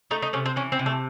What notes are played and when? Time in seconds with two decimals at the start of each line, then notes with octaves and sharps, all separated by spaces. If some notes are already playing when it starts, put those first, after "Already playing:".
0.11 A3 D#4
0.22 D#4
0.33 C3 C#4
0.46 C4
0.56 E3 C#4
0.72 C4
0.79 C3
0.86 A3